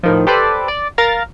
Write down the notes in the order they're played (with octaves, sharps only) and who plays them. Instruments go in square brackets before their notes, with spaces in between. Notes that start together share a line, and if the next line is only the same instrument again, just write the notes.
[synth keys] A2 D#3 F3
G4 A4 B4 C5 D5
D5
A#4 F5 A#5 F6 A6